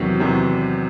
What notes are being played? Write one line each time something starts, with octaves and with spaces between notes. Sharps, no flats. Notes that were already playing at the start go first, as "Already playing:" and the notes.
Already playing: E2 C3 D#3 F#3 C#6
E2 C3 D#3 F#3